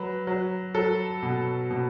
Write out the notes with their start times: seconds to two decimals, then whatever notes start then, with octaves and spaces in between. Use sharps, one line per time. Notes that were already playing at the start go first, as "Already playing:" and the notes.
Already playing: F#3 B4
0.27 F#3
0.75 F#3 A4
1.23 B2
1.71 B2